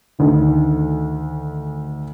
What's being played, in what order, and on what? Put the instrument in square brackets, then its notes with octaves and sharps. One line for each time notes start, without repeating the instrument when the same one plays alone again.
[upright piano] D2 D#3